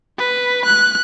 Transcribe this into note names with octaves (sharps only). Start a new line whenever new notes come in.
B4
F#6